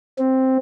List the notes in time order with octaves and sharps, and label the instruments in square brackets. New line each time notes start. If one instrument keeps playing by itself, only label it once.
[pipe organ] C4